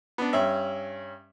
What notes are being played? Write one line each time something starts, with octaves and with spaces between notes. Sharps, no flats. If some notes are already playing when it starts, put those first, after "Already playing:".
B3 D4
G2 C#4 E5